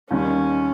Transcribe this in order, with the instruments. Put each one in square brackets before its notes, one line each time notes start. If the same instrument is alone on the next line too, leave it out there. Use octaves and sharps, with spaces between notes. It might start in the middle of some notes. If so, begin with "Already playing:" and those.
[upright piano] D#2 D#3 G3 [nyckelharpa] C#4